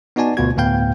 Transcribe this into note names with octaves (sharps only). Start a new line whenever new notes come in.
B3 D#4 F#4 D5 G#5 A5
D2 B2 B3 F4 F#4 G#6
D2 A2 B3 F5 G5 G6